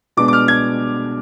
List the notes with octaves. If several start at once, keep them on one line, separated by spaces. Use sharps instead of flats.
B2 G#3 B3 D4 D6
D6
F6
G#6